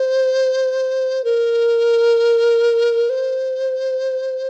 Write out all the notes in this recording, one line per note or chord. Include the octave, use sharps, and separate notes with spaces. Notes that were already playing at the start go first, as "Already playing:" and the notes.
Already playing: C5
A#4
C5